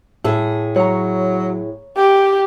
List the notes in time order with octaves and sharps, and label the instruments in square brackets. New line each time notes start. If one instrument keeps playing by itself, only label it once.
[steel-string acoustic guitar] A2 G#4 [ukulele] A4
[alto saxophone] F#3 [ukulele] C#5 A#5
[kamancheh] G4 [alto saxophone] G5